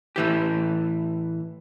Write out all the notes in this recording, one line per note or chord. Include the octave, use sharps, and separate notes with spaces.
A2 E3 G4